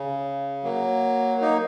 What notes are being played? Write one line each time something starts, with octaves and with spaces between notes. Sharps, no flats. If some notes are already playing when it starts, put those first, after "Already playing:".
Already playing: C#3
F#3 A#3
A#3 D#4